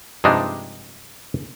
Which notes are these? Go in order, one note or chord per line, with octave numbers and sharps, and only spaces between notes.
G2 C3 F3 G#3 D4 D#4